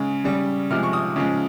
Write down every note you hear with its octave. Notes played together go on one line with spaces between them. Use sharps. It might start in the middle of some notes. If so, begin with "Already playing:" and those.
Already playing: C#3 G#3
C#3 G3
C3 F3 G#3 F6
C#6
D#6
C#3 F3 G#3